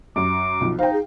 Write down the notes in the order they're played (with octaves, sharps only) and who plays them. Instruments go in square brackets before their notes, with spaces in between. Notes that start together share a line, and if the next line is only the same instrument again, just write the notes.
[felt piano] F#2 [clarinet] D6
[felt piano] B1 F3
[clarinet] D#4 [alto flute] C5 [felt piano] F5 G5
[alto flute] G#4